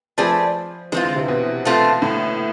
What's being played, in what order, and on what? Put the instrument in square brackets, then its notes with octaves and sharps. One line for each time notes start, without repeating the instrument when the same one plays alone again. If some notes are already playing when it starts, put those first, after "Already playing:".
[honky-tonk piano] F3 [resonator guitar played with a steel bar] A3 C4 G#4 B4 D5
[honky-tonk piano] E3 [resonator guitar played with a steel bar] G#3 C4 F4
[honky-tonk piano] D3
C3
B2
[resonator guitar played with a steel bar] A2 E3 A3 C4 F4
[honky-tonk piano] A2